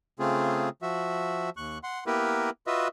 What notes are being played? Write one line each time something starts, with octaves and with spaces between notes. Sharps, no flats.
C#3 A3 C4 F4 G#4
F3 F#4 E5
D#2 C#6 F#6
F#5 C6
A#3 B3 E4 G4 A#4 B4
F4 F#4 B4 D#5 E5